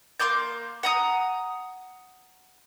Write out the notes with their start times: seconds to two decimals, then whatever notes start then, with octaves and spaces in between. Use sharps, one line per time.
0.20 A#3 C6 D6 G6
0.83 F#5 A#5 D#6